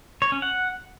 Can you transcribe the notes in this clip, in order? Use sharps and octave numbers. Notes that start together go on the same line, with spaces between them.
C#5
C#4
F#5